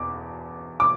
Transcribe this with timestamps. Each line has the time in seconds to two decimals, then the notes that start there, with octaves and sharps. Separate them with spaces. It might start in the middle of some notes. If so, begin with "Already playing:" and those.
Already playing: E2 B2 D6
0.80 D6